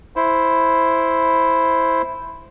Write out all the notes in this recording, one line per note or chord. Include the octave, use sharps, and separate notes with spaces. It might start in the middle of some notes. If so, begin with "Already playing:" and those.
E4 C5